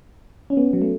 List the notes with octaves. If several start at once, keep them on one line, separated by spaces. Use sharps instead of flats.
C#4
B3
F#3
A3